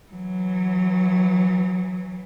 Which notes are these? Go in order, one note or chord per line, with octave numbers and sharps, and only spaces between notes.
E3 F#3